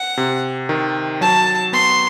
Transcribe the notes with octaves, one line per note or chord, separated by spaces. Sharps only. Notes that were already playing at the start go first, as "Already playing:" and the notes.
Already playing: F#5
C3
D#3
F#3 A5
B3 C6